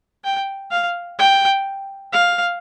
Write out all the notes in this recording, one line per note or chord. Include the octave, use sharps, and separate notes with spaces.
G5
F5
G5
F5